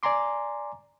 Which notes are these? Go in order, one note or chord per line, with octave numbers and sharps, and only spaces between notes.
D5 G#5 A#5 C6 D6